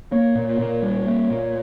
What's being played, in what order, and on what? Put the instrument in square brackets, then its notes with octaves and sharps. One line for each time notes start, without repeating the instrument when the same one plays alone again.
[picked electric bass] A#3 [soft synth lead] C#5
[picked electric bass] A#2
A#2
G3
A#3
A#2